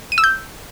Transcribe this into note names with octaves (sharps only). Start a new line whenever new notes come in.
D#7
E6
G6